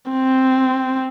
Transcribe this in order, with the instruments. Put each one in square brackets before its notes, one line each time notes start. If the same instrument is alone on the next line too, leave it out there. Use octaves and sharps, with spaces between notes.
[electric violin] C4